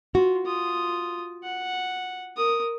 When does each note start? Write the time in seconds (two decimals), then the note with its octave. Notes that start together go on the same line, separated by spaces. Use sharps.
0.15 F4 F#4
0.45 F4 D#6
1.44 F#5
2.37 A#4 D#6